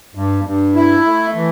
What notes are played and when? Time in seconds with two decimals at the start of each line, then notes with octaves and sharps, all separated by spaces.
0.15 G2
0.44 G2
0.75 E4
1.05 A3
1.35 E3